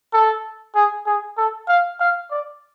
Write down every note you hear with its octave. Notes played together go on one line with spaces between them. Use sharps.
A4
G#4
G#4
A4
F5
F5
D5